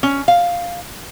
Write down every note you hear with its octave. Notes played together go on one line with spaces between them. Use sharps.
C#4
F5